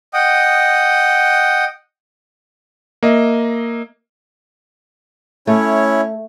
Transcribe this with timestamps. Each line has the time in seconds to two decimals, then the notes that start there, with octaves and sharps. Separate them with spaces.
0.14 D#5 F#5 G5 D#6
3.03 A#3 D#5 E5
5.47 A3 C#4 E4 C#5